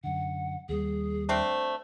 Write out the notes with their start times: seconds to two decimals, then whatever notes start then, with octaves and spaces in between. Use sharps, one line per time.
0.04 F#2 D3 F#5
0.69 D#2 G3 G#4
1.29 A3 C4 D4 C5